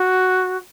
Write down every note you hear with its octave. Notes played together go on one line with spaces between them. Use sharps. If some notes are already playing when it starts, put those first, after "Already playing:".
Already playing: F#4